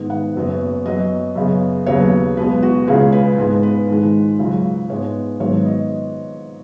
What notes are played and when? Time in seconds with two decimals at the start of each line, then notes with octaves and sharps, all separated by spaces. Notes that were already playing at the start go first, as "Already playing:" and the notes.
Already playing: G#2 D#3 B3
0.10 F#5
0.35 F#1 F#2 F#3 B3
0.85 F#2 F#3 B3 D#5
1.35 F#2 C#3 B3
1.86 D#2 C#3 F#3 B3 C#5
2.37 B1 B2 G#3 B3 B4
2.63 F#4
2.88 C#2 C#3 G#3 G#4
3.12 B4
3.38 G#2 G#3 B3
3.63 B4
3.89 G#2 D#3 G#3
4.39 C#2 C#3 F#3
4.89 G#2 G#3 B3 C#5
5.40 G#1 G#2 D#3 F#3 B3 C#5
5.66 D#5